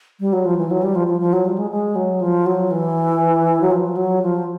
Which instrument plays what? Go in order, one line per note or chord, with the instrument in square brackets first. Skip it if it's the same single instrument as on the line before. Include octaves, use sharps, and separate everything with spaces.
[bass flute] G3
F#3
F3
E3
F#3
G3
F3
F3
F3
F#3
G3
G#3
G#3
F#3
F3
F#3
E3
F#3
F3
F#3
F3